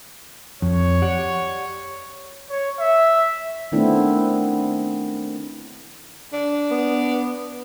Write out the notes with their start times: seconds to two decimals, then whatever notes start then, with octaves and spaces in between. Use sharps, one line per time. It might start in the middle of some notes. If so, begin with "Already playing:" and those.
0.62 F2 C#5
1.02 G4 D5 F#5
2.50 C#5
2.79 E5
3.72 D#3 A3 B3 C4 D4 E4
6.33 D4
6.71 B3